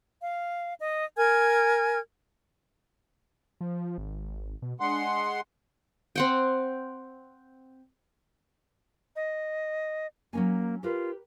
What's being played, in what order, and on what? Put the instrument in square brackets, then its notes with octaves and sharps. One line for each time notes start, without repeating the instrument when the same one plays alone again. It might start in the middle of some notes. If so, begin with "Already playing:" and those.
[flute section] F5
D#5
A#4 G#5 F6 G#6
[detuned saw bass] F3
G#1
B2
[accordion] G#3 F#5 C6 [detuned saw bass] D4
[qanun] C4 F#5 G5
[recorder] D#5
[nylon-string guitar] F#3 C#4 G#5 [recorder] A#3
[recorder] F4 [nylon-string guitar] G4 A#4 B4